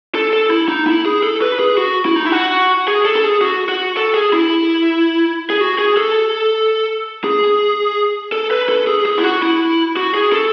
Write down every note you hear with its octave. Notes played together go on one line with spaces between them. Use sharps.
A4
A4
E4
D#4
E4
G#4
A4
B4
G#4
F#4
E4
D#4
E4
F#4
G#4
A4
A4
G#4
F#4
F#4
A4
G#4
E4
G#4
F#4
G#4
A4
G#4
A4
B4
A4
G#4
G#4
E4
F#4
E4
F#4
G#4
A4